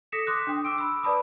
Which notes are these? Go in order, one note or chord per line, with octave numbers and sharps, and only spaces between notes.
A4 D#6 A#6 B6 C#7 E7
C6 D6 D#6 F#6
D4 G5
D6 E6 D7
B5 E6
B4 D5 A5 B5 D#6